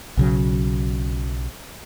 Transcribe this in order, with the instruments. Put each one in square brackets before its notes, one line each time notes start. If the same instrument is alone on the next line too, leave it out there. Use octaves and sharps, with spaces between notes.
[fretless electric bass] B1 C#3 F#3